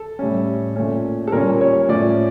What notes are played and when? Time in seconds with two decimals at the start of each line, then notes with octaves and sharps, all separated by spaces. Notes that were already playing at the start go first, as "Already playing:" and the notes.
Already playing: A4
0.19 A2 G3 C#4
0.76 A#2 A3 C#4
1.27 A4
1.32 A#2 G3 C#4 A#4
1.61 C#5
1.89 A2 F3 C#4 D5